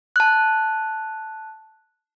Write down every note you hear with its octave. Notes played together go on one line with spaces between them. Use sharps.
A5 F#6